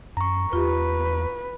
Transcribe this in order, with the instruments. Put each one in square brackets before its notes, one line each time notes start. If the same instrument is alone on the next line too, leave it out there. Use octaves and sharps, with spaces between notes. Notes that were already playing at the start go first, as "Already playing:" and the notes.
[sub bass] F#2 [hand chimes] A#5 C#6
[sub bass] E2 [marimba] F4 G4 [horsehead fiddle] B4